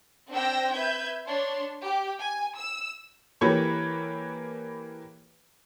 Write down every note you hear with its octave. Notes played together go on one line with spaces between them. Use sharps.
C4 D4 G5 E6 A#6
B4 E5 G6 G#6
D4 C#5 C6
G4
G#5
E6
E3 A#3 G4 A4 B4 C#5